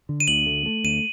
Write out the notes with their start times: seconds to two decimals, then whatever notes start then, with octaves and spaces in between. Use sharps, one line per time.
0.09 D3
0.20 D#7
0.28 D2 F#7
0.46 A3
0.66 A3
0.84 D2 D#7